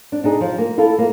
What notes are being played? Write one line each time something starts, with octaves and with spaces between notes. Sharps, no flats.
D4
D4 D#4 G#4
F3
A#3
E4 F4 A4
A#3